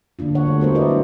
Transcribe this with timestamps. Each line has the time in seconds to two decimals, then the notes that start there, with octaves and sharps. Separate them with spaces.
0.19 D3 A#3 D4 F4
0.35 D3 C#5 F#5
0.47 G3 A3
0.60 B3 F#4 A#4 C5
0.75 E4 A#4 B4 D5 D#5
0.89 F#3 D4